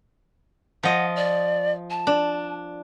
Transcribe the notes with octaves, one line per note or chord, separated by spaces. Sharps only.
F3 D#5 F#5
D5
A5
D4